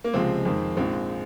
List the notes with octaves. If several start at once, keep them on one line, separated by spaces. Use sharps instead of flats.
A#3
C#2 C3 F3 G#3 C4
F2 D#3 G#3
A#1 G#2 F3 G#3 C4